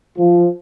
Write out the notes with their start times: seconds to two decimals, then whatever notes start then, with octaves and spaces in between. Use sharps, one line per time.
0.18 F3